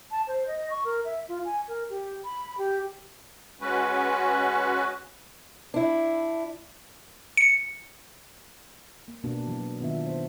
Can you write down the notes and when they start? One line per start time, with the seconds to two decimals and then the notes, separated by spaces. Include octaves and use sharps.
0.11 A5
0.27 C5
0.47 D#5
0.70 C#6
0.85 A#4
1.05 E5
1.29 F4
1.45 G#5
1.68 A#4
1.90 G4
2.24 B5
2.58 G4
3.61 G#3 C#4 F#4 B4
5.74 D4 E4
7.37 C#7
9.08 A#3
9.24 B2 A#3 B3 D4
9.47 E3 F#3
9.80 D#3 B3 D4 F4 E5
10.06 C5